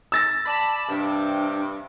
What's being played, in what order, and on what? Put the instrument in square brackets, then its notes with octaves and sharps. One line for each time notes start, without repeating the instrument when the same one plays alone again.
[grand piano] E6 A6 A#6
[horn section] D5 B5 [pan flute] A5
[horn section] G2 C3 [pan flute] D4